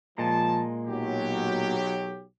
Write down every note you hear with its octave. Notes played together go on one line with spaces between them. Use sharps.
A#2 F3 G#3 A5
B1 F#3 G4